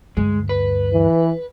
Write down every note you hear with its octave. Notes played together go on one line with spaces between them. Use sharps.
D2 G2 G#3
B4
E3